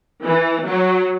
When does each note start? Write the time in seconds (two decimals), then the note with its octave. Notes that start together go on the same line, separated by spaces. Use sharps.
0.23 E3
0.66 F#3